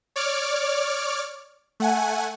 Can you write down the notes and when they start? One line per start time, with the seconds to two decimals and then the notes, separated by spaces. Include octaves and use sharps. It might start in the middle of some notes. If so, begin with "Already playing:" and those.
0.16 C#5 D5 D6 F6
1.80 A3 F#5 G#5